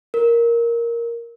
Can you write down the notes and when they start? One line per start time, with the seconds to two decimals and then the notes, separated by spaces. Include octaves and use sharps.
0.14 A#4